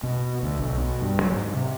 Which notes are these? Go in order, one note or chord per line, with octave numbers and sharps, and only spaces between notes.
B2
D2
B1
B2
G2
F#3
G#2
C3